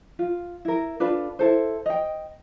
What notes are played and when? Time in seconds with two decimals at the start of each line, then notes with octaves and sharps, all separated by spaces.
0.19 F4
0.65 E4 A#4
1.00 D4 F4 A4 B4
1.39 E4 A4 C5
1.86 D#5 G5